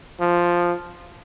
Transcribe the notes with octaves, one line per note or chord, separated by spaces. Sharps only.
F3